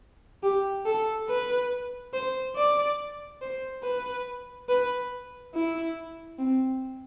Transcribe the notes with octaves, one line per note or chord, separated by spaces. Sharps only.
G4
A4
B4
C5
D5
C5
B4
B4
E4
C4